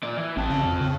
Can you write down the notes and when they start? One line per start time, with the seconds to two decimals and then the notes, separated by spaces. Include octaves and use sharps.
0.03 A#2 D5
0.18 E3
0.37 A1 C4 A5
0.50 C#3
0.65 F2
0.81 C#3